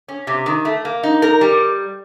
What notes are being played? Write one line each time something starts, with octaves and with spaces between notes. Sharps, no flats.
C#4
C3
D#3
A3
A#3
D#4
A#4
G3